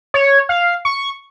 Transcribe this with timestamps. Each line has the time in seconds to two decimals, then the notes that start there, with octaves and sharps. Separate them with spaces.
0.14 C#5
0.49 F5
0.85 C#6